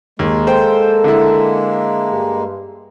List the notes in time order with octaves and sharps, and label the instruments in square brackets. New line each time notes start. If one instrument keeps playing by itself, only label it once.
[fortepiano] D#2 [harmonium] G#3 A#3
[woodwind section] A4 [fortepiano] C5 G5
[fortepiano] D3 E4
[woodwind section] G2